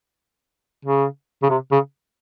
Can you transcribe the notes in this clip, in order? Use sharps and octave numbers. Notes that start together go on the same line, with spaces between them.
C#3
C#3
C3
C#3